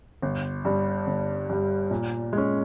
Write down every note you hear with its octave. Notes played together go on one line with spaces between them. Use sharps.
G1
G2 G3
G1
G2 G3
A#2
G#3 C#4